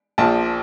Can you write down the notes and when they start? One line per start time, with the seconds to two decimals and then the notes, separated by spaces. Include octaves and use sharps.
0.18 A#1 A#2 F3 A5